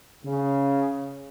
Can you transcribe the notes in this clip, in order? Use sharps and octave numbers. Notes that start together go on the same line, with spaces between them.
C#3